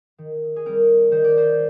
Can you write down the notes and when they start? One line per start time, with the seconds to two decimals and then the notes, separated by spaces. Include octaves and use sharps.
0.18 D#3
0.56 G#4
0.66 G3 C4 A#4
1.11 D#3 C5
1.24 D5
1.37 C5